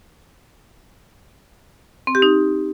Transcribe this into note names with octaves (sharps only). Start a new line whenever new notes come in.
C4
G4
D#4